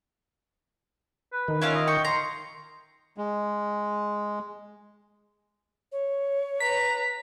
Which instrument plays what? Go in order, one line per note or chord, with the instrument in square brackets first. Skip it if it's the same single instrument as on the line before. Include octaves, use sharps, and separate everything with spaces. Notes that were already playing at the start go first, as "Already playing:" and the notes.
[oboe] B4
[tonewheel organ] D#3
[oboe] C#4 [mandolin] E4 F4 F5
[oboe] D#5
[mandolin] G5 C#6
[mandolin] A#5 [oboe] C6
[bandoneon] G#3
[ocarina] C#5
[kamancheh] B4 A#5 [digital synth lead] B6